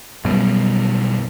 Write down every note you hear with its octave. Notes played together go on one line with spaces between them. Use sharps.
B1 F#2 B2 G3